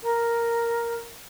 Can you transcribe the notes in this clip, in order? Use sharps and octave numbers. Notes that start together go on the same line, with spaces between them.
A#4